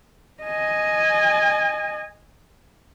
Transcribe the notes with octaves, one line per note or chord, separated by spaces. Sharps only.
D#5 G#5